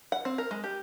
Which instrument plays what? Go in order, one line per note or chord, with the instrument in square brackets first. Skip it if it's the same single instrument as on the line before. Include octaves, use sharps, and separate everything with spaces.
[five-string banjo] F#5
C4
A#4
G#3
G4